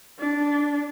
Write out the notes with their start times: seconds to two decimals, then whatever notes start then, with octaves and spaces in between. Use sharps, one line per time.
0.19 D4